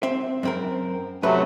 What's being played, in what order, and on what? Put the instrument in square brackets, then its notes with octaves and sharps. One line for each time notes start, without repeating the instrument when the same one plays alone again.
[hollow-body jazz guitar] C4 E5
F#2 C4 A#4
[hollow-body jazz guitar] F#2 B4 [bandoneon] C3 F#3 A3